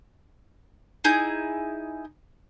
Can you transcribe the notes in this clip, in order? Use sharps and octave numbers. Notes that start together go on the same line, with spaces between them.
D#4 E4 G#4 G6